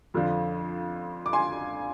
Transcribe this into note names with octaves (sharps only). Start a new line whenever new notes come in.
F2 D3 F3
D6
G#5 C6